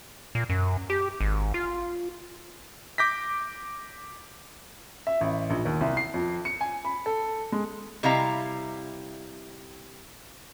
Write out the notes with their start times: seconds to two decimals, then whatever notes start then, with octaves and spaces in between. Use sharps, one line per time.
0.35 A#2
0.50 F#2
0.90 G4
1.20 G#1
1.54 F4
2.98 D6 G6 A#6 B6
5.07 E5
5.21 A1
5.50 A#1
5.65 D#2
5.81 C2
5.97 C7
6.14 F2
6.45 C#7
6.61 G#5
6.85 B5
7.06 A4
7.52 G#3
8.03 C3 G3 E4 D#5 F5 A#5